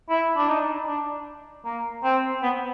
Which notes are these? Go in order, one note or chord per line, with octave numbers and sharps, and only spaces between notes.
E4
D4
D#4
D4
A#3
C4
B3